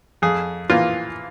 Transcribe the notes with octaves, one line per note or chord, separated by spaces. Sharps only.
F2 G#4
E3 A#3 F4